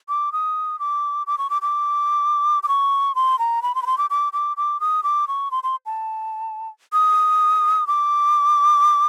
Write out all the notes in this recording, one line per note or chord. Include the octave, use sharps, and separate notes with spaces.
D6
D#6
D6
D6
C#6
D6
D6
D6
C#6
C6
A#5
B5
C6
B5
C6
D6
D6
D6
D6
D#6
D6
C#6
C6
C6
A5
D#6
D6